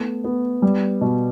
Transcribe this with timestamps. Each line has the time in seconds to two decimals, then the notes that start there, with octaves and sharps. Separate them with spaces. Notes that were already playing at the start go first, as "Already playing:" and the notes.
Already playing: A3 B3
0.24 B3
0.62 G3
1.01 B2